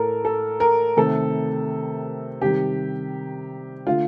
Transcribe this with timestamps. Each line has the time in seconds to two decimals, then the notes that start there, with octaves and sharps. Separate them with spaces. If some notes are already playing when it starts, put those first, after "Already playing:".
Already playing: A2 A3 A4 A#4
0.25 A4
0.60 A#4
0.97 C3 D#3 A3 A4
2.41 C3 D#3 G3 G4
3.86 D3 A3 F4